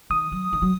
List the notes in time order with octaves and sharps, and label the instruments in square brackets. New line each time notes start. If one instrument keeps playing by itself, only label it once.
[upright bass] D#3 [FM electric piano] D#6
[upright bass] F#3
D#3
F#3